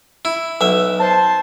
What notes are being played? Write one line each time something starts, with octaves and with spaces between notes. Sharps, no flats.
E4
B1 E5
C5 A5